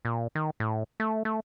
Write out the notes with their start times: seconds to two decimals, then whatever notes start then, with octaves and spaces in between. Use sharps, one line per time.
0.05 A#2
0.35 D#3
0.60 A2
1.00 A3
1.25 A3